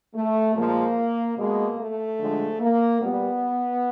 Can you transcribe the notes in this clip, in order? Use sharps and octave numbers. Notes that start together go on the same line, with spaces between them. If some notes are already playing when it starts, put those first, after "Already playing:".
A3
A#2 F3 G#3 A#3
B2 G#3 A#3
A3
D3 F3 G#3
A#3
A#2 G3 B3